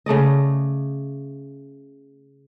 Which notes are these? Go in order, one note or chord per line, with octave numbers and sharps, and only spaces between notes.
C#3 A3 D5 D#5